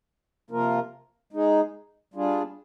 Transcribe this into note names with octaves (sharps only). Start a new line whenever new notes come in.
C3 F3 A#3 F4 A#4
G#3 D#4 G#4
G3 D4 F4 G#4